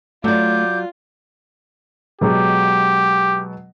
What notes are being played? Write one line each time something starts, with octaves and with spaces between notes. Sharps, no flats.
F#3 A3 F4 D5 D6 G6
B2 F#3 G#3 G4